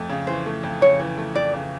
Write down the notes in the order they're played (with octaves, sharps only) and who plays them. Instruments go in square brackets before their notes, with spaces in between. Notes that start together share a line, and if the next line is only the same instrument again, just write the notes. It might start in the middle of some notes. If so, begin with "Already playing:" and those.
Already playing: [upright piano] F2 A3
C#3
[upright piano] E3 [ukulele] C5
[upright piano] A3
F2
[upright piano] C#3 [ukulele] C#5
[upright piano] E3
A3
[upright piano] F2 [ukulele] D5
[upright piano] C#3